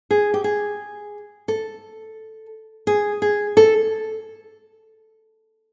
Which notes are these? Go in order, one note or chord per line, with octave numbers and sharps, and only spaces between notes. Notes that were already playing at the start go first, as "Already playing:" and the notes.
G#4
G4
G#4
A4
G#4
G#4
A4